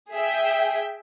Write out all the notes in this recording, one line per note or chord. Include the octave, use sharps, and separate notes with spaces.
G#4 E5 G5